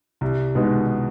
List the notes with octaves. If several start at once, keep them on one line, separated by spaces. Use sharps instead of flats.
C2
B2 G#3 B3 D#4